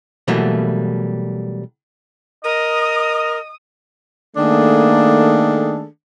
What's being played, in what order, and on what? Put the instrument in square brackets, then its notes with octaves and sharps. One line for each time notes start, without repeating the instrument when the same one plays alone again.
[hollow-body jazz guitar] B2 E3 F#3 G3 A3 A#3
[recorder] A#4 [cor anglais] D#5 [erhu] D#6
[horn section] D#3 A3 A#3 D4 G#4 A4